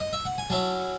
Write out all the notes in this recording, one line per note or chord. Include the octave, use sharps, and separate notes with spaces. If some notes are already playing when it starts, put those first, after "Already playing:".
D#5
E5
F#5
G#5
F#3 C#4 E4 A5